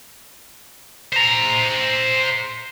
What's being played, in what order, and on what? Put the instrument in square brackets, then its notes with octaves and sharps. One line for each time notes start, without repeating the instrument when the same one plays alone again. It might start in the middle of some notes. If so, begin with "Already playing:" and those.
[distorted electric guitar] C5 A#5